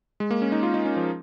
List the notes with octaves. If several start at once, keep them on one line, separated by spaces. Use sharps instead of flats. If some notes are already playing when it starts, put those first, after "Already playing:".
G#3
A#3
C#4
D#4
F4
D#4
C#4
F3